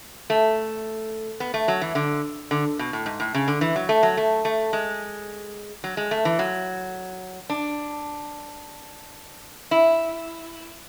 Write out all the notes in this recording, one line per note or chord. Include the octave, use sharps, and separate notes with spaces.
A3
B3
A3
F#3
E3
D3
D3
B2
A2
G#2
A2
C#3
D3
E3
F#3
A3
F#3
A3
A3
G#3
F#3
G#3
A3
E3
F#3
D4
E4